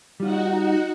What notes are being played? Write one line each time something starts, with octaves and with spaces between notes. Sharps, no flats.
G3 D#4 F4 F#4 F#5